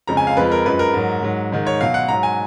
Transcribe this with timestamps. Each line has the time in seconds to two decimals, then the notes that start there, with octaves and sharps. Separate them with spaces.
0.07 F2 C#3 G#3 A#5
0.17 G#5
0.27 F5
0.37 F2 F3 G#3 B4
0.52 A#4
0.65 F#2 F3 G#3 B4
0.79 A#4
0.94 G#2 F#3
1.23 G#2 F#3
1.52 G#2 D#3 G#3
1.67 C#5
1.80 B2 F#3 F5
1.94 F#5
2.09 G#2 F#3 A#5
2.23 G#5